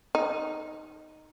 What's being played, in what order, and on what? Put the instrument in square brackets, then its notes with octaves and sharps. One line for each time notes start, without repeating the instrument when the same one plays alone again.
[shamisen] D#4